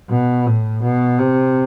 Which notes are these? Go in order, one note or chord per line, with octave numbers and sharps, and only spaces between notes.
B2
A2
B2
C3